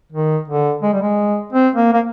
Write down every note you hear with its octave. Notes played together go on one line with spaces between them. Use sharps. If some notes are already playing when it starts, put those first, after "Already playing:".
D#3
D3
G#3
G3
G#3
C4
A#3
A#3